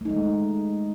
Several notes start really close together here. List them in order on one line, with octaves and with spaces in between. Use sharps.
A3 D#4 G#3